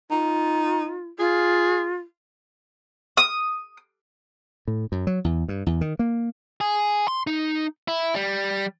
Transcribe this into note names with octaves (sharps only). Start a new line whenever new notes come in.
D#4 F4
F4 G#4
D#6
A2
F#2
F#3
E2
G2
E2
D#3
A#3
G#4
C6
D#4
E4
G3